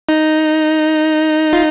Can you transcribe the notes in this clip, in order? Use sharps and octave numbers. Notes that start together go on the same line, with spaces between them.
D#4
F4